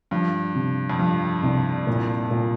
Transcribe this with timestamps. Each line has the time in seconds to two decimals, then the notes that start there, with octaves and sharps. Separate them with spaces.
0.11 G2 F3
0.55 C3
0.90 F2
0.99 G2 F3
1.43 C2
1.87 A#2
2.31 A#2